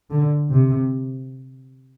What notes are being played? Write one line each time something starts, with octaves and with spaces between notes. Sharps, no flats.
D3
C3